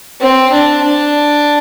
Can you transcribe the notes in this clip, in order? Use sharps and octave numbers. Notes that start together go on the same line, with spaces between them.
C4
D4
D4